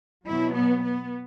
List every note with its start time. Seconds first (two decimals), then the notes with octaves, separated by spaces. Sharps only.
0.25 B2 F#3 E4
0.55 B3
0.83 B3